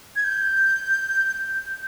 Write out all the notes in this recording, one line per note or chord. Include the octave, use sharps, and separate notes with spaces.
G#6
G6